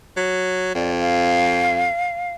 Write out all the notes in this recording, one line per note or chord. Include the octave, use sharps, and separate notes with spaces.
F#3
F2 D5
F5